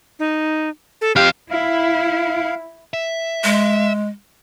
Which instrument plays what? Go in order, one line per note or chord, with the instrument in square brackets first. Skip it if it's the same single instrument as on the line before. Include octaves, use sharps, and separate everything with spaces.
[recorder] D#4
A4
[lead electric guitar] F2 F5 [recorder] G4
[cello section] E4 [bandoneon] F5
[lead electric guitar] E5
[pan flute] G#3